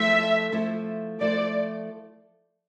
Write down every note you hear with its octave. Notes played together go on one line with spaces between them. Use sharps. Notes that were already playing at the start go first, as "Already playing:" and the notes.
Already playing: F3 A3 E4 A4 C5 E5
F3 A3 E4 A4 C5
F3 A3 E4 A4 C5 D5